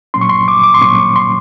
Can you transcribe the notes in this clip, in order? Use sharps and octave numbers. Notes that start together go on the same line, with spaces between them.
A#2 F#3 A#3 C#4 C6
C#6
C6
D6
D6
C6
A#2 F#3 A#3 C#4 C#6
C6